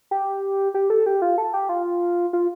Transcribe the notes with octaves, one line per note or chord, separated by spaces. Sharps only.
G4
G4
A4
G4
F4
A4
G4
F4
F4